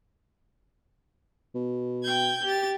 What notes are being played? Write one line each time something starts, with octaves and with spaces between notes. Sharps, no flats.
B2
G5 G6 G#6
G4 A6